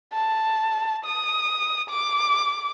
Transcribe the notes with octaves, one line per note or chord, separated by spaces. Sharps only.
A5
D#6
D6